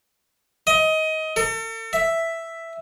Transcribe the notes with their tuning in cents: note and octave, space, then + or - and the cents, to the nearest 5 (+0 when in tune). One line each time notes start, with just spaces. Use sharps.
D#5 +20
A4 +40
E5 +5